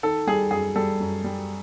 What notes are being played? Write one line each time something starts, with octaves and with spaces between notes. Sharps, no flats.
D#3 A4
G3 G#4
F#2 G#4
G3 A4
F#2
G3